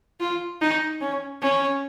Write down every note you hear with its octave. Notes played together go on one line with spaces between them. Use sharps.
F4
D#4
C#4
C#4